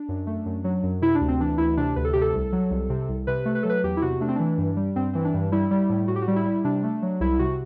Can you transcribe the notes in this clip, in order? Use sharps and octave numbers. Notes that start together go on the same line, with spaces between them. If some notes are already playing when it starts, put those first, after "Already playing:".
Already playing: D4
F#2
A3
F#2
F#3
F#2
C3 E4
D4
D2
C4
E3 D4
D2 E4
C3 D4
D2 B4
A4
C3 G4
A4
C2
F#3
C2
C3
C2
C3 B4
A3
B4
F#3 A4
B4
E2 G4
E4
C3 F#4
A3 D4
C4
E3 D4
G2
G3
G2 C4
E3 C4
D4
G2
G3 E4
G3
A2
A2 F#4
G4
F#4
G3
E4
G3
C3 D4
A3
F#3
C2 E4
C3 F#4